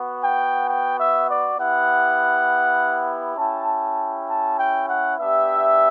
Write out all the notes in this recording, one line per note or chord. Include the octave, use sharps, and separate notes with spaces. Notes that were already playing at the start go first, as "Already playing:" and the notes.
Already playing: B3 F#4
G5
G5
E5
D5
B3 E4 G4 F#5
C#4 E4 G4 A5
A5
G5
F#5
B3 D4 G4 E5